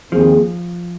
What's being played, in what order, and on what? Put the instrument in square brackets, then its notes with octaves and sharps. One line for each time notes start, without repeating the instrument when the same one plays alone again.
[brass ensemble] D#2 D#3 C4 G#4 [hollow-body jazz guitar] F3